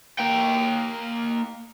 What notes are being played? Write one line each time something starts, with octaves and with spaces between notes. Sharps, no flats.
A#3 G5